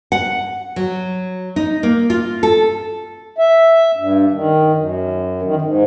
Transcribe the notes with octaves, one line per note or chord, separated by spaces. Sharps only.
F#5
F#3
D#4
A#3
F4
A4
E5
G2
D#3
F#2
D#3
G#2